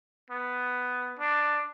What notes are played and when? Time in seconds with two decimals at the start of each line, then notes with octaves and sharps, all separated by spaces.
0.30 B3
1.19 D4